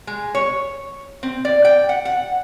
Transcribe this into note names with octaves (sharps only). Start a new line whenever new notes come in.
G#3
C#5
C4
D5
G5
F#5
F#5